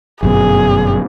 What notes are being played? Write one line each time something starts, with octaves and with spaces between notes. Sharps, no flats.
G1 F#2 B2 G#4